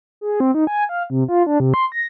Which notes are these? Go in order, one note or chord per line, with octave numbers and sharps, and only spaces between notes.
G#4
C4
D#4
G#5
F5
C3
F4
D4
C3
C6
A#6